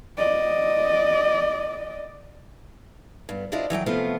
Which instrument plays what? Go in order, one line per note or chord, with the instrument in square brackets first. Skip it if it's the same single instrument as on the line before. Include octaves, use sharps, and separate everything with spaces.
[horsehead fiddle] D5 D#5
[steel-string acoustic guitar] G2 B3
D4 E4 F4 C5 D5 D#5
E3 F#3 F5 G5
C3 F3 A3 B3 F4